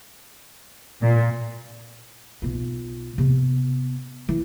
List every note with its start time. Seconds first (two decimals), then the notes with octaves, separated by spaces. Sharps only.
1.02 A#2
2.42 B1 F4
3.18 C3 B3
4.29 E3